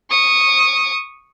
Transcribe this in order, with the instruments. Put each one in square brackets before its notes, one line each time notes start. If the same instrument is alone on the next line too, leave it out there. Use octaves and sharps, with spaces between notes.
[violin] C#6 D#6